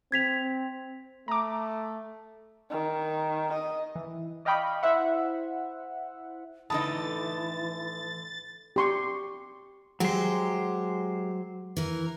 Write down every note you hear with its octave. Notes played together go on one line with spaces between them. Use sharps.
C4 G#6 B6 F7
A3 A#5 D6
D#3
D#5
E3
D5 D#5 F5 G5 B5 C#6
E4 C5 E5 F#5
A2 D3 E3 D#4 A5 B5 D#6 A6
G4 C6 C#6
F#3 G#3 G4 C5
E3 A#4